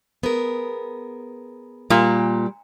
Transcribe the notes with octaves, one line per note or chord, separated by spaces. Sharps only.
B3 G#4 A#4
A#2 G3 G4